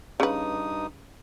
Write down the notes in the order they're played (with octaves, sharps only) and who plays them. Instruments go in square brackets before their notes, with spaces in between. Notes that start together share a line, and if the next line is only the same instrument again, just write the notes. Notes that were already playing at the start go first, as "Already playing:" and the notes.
[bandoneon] G2 D#4 D#6 [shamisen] C#3 B4